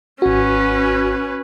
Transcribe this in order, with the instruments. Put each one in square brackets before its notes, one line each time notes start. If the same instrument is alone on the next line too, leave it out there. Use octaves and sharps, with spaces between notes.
[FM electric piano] G#1 F#4 [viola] C#4 B4